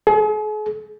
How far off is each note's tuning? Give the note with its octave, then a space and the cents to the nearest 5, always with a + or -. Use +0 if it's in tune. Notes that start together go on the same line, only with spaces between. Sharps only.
G#4 +45